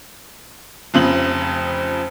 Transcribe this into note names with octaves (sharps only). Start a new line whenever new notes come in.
F1 F2 C#3 F#7